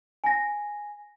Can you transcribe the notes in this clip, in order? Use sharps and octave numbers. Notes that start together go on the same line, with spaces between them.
G#5 A#6